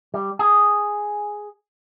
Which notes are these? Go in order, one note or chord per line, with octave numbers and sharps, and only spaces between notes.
G3
G#4